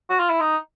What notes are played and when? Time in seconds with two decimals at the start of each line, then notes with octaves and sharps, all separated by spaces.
0.10 F#4
0.20 F4
0.30 E4
0.40 D#4